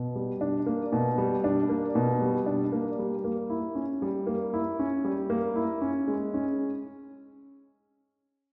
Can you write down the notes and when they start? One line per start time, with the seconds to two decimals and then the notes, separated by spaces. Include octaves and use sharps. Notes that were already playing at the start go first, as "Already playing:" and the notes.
Already playing: B2
0.16 G3
0.41 D4
0.66 A#3
0.93 B2
1.18 G3
1.44 D4
1.69 A#3
1.95 B2
2.22 G3
2.46 D4
2.72 A#3
2.99 G3
3.24 A#3
3.50 E4
3.75 C#4
4.02 G3
4.27 A#3
4.54 E4
4.79 C#4
5.05 G3
5.30 A#3
5.56 E4
5.82 C#4
6.08 G#3
6.34 C#4